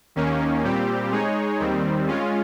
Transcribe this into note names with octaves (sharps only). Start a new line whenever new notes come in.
D#2 D#3 A#3 C#4
A#2 G3 C4 G4
G#3 D#4 G#4 C#5
D#2 D#3 G3 C4
G#3 C#4 F4